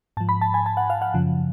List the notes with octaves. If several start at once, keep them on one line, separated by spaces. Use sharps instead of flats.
G#2 F3 A5
B5
A5
G#5
A5
F#5
F5
F#5
F#2 C#3 F3